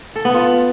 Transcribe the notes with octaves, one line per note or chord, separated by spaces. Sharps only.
A4
B3
F4